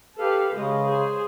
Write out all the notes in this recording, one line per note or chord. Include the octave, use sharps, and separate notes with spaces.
G4 A4 B4 F5
C#3 G#3 D#5
G#4 C5